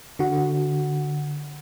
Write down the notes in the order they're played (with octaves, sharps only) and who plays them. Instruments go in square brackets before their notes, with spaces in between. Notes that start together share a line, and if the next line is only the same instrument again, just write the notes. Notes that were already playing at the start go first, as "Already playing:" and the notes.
[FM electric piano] D3 F#4